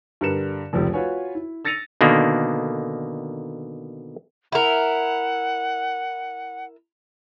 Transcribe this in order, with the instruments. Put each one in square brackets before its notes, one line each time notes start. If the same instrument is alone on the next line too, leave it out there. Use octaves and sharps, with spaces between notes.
[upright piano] G2 D3 A#4 B4 C#7 E7
F1 C#2 F3 G4
F4 F#4 B4 C#5 G#5
E4
E6 A6 A#6 C#7 D#7 F7
[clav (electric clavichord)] B2 D3 D#3 A#3
[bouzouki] E4 A#4 [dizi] F#5